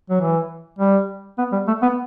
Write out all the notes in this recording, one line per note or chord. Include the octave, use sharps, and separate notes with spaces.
F#3
E3
G3
B3
G3
A3
B3